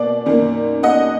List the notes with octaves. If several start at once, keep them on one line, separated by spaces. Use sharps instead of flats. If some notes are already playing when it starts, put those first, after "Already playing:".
Already playing: B2 A#3 D5
F#2 D#3 A#3
D#5 F#5